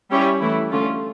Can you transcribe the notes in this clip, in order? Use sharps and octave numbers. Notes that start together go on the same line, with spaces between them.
G3 C#4 E4 G4 C#5
E3 A3 E4
D3 A3 C#4 F4